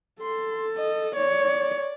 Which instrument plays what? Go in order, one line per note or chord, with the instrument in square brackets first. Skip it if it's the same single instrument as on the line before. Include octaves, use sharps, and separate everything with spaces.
[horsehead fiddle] A4 [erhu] C6
[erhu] D#5
[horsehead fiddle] C#5 [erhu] D5